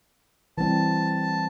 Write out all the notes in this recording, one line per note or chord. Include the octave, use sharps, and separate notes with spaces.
E3 G3 C4 A5